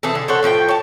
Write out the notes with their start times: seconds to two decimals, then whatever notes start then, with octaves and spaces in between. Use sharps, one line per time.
0.03 E3 C4 G#4 A4
0.15 D3
0.28 A4 C5 C#5 F#5
0.43 A2 F3 F#4 G5
0.69 C#5 A5